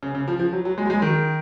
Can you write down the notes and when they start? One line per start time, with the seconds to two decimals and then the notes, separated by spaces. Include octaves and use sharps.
0.03 C#3
0.15 C#3
0.28 F3
0.39 F3
0.52 F#3
0.65 F#3
0.78 G#3
0.86 F#3
0.90 G#3
1.02 D#3